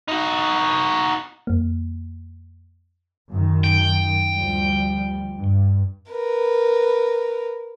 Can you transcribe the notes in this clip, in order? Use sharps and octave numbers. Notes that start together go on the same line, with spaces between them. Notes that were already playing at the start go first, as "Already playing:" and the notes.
D#4 F#4
F2 A#3
F#2 D#3
G5
D2 F3 G3
G2
A#4 B4